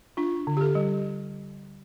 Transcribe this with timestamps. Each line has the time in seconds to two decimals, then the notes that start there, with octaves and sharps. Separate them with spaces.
0.17 D4 F4
0.47 D3
0.57 G4
0.61 A4
0.75 G3